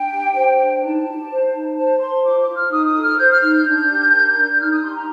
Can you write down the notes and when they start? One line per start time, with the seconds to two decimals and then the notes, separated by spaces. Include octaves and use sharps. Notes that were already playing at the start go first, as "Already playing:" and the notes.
Already playing: D4 G5
0.12 G4
0.34 C5
0.59 D4
0.82 D#4 A5
1.06 G4
1.30 C5
1.52 D#4
1.76 C5 A5
1.99 C5 C6
2.23 F4 D6
2.40 D6
2.47 F4
2.55 F6
2.70 D#4 D#6
2.86 D#6
2.94 A4
3.02 F6
3.17 C5 G6
3.30 F6
3.41 D#4 F6
3.53 G6
3.65 D4
3.88 G4
4.12 A#4
4.35 D4
4.52 G6
4.59 D#4 F6
4.71 D#6
4.82 G4 C6
4.95 A#5